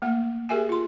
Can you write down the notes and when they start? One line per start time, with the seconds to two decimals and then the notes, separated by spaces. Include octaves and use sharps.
0.02 A3 A#3 G5
0.49 G4 G#4 A#4 E5 G5 G#5
0.69 F4 C6